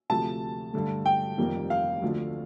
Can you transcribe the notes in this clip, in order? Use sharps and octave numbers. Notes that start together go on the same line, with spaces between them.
D2 C3 F3 A3 A5
G2 D3 A3
G5
F1 F2 D#3 G3 A#3
F5
D2 D3 F3 A3